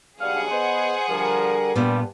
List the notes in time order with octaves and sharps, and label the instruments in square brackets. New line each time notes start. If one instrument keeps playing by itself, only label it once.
[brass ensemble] B1 G2 G3 [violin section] G#4 F#5 [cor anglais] F5
[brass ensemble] B3 B4 D#5 [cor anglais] C5
[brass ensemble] D3 G3 A#4 [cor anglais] F3
[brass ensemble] G2 [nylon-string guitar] A#2 B3 [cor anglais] G3